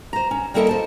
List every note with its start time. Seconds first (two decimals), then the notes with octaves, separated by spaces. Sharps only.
0.13 C5 A#5
0.31 C#4
0.54 G3 A#3 E4 A4 A#4 D#5
0.69 C5 A5